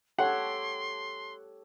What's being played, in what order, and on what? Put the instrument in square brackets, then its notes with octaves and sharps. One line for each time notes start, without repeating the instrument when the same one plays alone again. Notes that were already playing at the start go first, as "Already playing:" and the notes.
[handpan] G4 A4 C#5 [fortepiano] F#5 [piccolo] C6